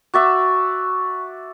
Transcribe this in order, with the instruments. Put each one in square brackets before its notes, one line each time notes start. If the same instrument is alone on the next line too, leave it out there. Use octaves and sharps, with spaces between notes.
[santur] F#4 D5 E5 [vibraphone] C#6